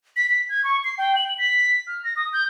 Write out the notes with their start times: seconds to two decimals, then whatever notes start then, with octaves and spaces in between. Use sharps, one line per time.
0.16 B6
0.30 B6
0.49 G#6
0.64 C#6
0.84 C7
0.98 G5
1.16 F#7
1.38 B6
1.87 F6
2.04 A#6
2.16 D#6
2.33 G6